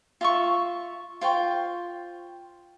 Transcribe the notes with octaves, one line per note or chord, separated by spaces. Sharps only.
F4 E5 C#6
F4 C5 G5 C#6